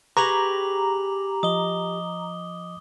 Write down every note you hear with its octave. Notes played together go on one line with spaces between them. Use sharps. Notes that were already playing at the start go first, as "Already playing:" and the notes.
G4 G#4 B4 A#5 C#6 D6 F7 F#7
F3 D#5 D#6 G7